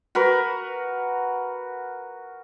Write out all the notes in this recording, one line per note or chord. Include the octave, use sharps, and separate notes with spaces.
F#4 A#4 B4